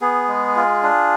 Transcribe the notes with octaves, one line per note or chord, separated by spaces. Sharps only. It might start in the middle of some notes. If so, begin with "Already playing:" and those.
B3 G#4
G#3
F4
D4